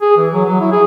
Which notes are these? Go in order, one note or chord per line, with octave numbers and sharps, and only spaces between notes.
G#4
E3
F#3
F#3
E4
G#4